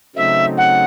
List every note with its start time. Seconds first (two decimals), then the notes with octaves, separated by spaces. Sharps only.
0.16 C#3 F#3 A3 C4 D#4 E5
0.57 F#5